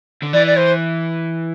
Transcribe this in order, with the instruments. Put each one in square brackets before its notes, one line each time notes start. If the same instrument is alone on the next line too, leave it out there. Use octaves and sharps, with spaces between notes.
[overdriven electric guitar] D3
[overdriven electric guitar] E3 [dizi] D5
[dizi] D5
C5